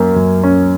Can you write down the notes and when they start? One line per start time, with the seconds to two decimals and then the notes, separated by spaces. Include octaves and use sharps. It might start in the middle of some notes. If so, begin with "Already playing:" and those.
Already playing: F#2 A#3 C#4
0.16 F#2
0.43 C#4